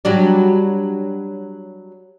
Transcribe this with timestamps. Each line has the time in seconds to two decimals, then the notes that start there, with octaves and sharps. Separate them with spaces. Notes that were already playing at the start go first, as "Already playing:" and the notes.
0.05 F#3 G3 D4